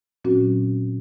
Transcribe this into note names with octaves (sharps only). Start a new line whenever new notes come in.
A#2 F#3 C4 C#4 F#4